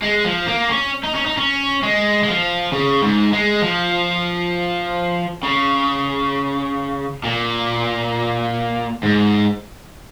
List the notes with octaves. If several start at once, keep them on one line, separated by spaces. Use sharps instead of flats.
G#3
F3
A#3
C#4
D#4
C#4
D#4
C#4
G#3
G#3
F3
C#3
G#2
G#3
F3
C#3
A#2
G#2